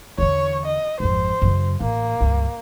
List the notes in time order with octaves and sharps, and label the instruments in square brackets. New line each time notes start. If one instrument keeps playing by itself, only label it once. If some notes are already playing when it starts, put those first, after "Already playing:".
[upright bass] E2 D3 [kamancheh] C#5 C#6
[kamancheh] D#5
[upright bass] G#1 F2 [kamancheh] C5
[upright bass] F#2 C#3
[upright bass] A1 [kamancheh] A#3
[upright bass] C#2 G2